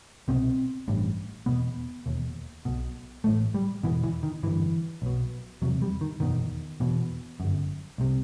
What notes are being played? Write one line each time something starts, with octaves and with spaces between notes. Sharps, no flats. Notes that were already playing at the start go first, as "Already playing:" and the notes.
C2 B2 C4
A1 G2
E1 E2 B2 B3
E1 D#2
B1 B2
A1 A2 A3
G3
E1 E2 B2 E3
E3
D#3
G1 G2 E3
B1 B2
E1 E2 C3 F#3
G3
D#3
F#1 E2 B2 D#3
E1 E2 B2
G1 F#2
C2 C3